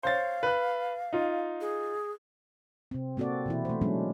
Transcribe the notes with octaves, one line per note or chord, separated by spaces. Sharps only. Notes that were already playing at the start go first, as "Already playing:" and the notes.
C5 C#5 F5 A6
B4 F#6
D#4 F4
G#4
C3 C4
A#3 C4 F#4 A4 D5
B2 E3 E4
A3 C5
F#3 G#3 A#3 C#4 D4